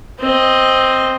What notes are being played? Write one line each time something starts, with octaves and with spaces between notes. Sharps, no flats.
C4 D#5